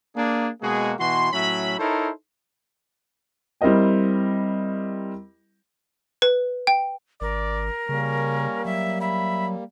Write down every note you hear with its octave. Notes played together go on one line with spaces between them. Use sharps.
A#3 D4 G#4
B2 G#3 A#3 F#4 G#4
B2 E3 F#4 C6
A2 F#3 C#4 E5 B5
D#4 E4 A4 A#4 C5 C#5
G3 C4 E4 A#4 D#5 G5
B4
G5
G#1 A#4 D5
C#3 G3 A#3 C#4
F#3 E5
E5 B5